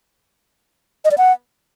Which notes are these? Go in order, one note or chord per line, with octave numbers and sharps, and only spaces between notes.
D#5
D5
F#5